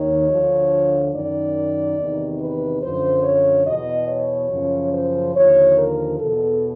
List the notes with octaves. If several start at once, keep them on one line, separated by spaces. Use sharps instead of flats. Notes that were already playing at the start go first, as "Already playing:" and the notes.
Already playing: D#2 D#3 C#5
D2 D3 F3
F#2 D#3 D5
E2 C3 D#3
B4
F#2 D3 F3 C5
C#5
E2 B2 D#5
C#5
F#2 C#3 F3
C5
D#2 D3 F3 C#5
A#4
E2 B2 A4